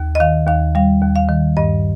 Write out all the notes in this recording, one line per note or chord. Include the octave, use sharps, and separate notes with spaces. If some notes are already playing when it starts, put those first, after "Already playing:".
Already playing: D#2
D#5
D#3 F5
D#2 F5
G3 F5
D#2
F5
D#3
G2 D#5